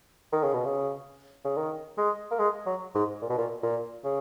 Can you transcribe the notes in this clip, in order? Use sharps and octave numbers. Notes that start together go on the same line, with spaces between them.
D#3
C#3
B2
C#3
C#3
D#3
G#3
A#3
G#3
F#3
G#2
A#2
B2
A#2
A#2
C#3